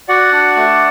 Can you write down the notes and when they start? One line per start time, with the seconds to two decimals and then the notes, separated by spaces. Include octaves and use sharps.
0.08 F#4 D5 F#5
0.32 D4
0.56 A3